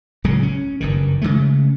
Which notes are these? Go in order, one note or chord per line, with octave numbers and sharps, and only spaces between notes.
D1 C#2 C#3 F#3
C#4
F#1 G2 D#3
C#3 E3 G#3 A3